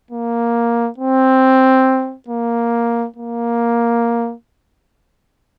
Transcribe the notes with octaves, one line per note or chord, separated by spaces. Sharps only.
A#3
C4
A#3
A#3